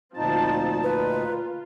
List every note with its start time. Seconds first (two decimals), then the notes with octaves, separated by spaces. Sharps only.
0.17 D2 A#2 F3 C4 D#4 A5
0.83 F4 B4